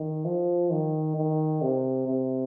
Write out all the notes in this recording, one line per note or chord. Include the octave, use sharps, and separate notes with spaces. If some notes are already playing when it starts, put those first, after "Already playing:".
Already playing: D#3
F3
D#3
D#3
C3
C3